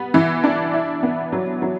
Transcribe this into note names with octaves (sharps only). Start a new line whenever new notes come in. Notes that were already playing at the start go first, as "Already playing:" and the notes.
Already playing: G3 B3
E3
D4
E4
B3
F#3
F#3